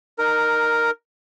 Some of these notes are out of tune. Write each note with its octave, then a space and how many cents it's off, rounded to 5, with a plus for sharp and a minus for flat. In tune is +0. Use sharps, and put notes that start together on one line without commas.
D#4 -20 A#4 +0